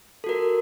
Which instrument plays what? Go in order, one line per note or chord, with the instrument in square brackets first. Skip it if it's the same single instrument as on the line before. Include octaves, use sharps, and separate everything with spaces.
[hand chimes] A4
F#4
A#4